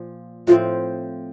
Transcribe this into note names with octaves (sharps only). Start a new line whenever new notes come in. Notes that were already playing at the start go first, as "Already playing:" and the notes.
Already playing: A#2 F3
A2 F3 C4 F4